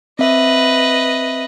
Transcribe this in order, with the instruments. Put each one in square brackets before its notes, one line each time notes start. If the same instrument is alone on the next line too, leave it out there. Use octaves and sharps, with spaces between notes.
[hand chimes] C4 E5 [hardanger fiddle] B4 D#5